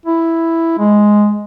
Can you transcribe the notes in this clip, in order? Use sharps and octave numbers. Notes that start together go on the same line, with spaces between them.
E4
G#3